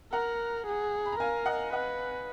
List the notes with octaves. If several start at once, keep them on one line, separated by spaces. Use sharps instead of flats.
A#4 F#5 A#5
G#4
B5
A#5
A#4 F5 G#5
D#5 F#5
B4 D#5 F#5